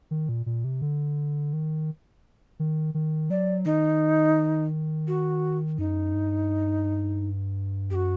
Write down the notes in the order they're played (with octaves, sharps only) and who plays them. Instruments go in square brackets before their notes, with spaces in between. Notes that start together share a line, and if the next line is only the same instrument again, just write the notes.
[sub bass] D#3
A#2
A#2
C3
D3
D#3
D#3
D#3
[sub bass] F#3 [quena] D5
[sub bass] D#3 [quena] D#4
[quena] F#4
[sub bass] F#2 [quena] D#4
[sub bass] G2
[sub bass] F#2 [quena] F#4 G4